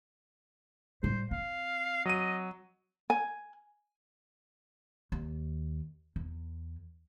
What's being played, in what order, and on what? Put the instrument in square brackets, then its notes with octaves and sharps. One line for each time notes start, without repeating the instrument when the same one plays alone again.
[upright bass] A2 G3 [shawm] C5
[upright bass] C4 [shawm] F5
[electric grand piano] F#3 D#7 [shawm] D#5
[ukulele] G#5
[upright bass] D#2
E2